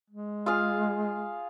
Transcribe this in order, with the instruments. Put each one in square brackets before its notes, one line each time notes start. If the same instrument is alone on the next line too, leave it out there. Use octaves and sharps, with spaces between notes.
[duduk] G#3
[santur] F4 G#4 F5